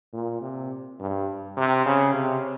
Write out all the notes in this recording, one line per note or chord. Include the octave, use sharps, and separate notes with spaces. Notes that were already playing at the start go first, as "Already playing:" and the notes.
A#2
C3
G2
C3
C#3
C3